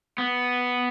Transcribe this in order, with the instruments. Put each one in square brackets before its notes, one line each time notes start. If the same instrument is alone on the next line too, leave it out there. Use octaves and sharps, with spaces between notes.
[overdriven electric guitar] B3